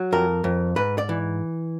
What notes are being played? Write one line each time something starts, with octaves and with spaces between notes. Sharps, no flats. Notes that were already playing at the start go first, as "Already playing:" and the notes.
Already playing: F#3
F2 A#4
F2
G#2 B4
D5
E3